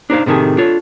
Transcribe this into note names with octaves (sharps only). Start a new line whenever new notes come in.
D4 D#4 C5 F5
A2 C3 D#3 A3 G#4
D4 F4 A4 C#5